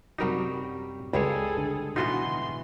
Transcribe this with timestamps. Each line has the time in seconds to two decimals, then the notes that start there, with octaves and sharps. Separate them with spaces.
0.18 F#2 C3 F#3 G3 D#4 G4 A#4
1.13 C#2 G3 G#3 G#4 A4 C#5
1.58 D3
1.96 B2 E3 B3 D#4 F4 F#4 C6